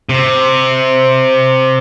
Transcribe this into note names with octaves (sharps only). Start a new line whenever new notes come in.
C3